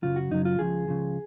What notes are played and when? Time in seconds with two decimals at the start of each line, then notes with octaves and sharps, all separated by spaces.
0.02 F#2 C#3 F#3 F4
0.16 F#4
0.31 F#2 C#3 F#3 D#4
0.45 F4
0.59 C#2 C#3 F3 G#4
0.88 C#2 C#3 F3